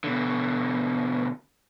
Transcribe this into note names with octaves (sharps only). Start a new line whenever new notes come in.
B2 D3